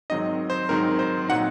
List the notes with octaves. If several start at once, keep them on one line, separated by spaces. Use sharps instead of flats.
G#2 D#3 F#3 C4 D#4 D#5
C5
G#2 D#3 F#3 C4 D#4 A#4
C5
A#2 F#3 C4 D#4 F#5